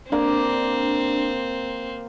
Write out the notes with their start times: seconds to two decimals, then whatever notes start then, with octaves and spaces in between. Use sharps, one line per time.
0.12 A#3 C4 D4